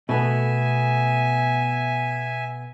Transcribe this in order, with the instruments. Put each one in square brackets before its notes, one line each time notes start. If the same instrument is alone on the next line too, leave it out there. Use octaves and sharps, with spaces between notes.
[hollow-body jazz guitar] B2 A3 B3 [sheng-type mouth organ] E5 G#5